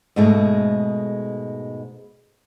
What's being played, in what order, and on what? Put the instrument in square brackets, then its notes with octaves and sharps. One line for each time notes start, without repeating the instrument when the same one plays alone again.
[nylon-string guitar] G#2 B2 G#3 A3